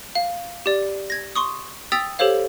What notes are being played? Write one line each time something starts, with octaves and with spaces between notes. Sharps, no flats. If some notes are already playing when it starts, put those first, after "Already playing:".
F5
G4 D5
G#6 A#6
C6 C#6 D#6
G5 D#6 E6 A6 B6 F7
G4 A4 C5 C#5 F5